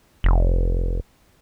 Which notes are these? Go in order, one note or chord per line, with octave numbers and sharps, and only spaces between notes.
F1